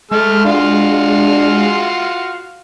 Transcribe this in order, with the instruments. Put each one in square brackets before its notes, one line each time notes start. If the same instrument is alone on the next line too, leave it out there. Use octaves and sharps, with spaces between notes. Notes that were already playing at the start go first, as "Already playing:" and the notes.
[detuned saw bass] G#3 [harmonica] A3 A4 F6
[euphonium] D4 [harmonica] F4 F#4 F5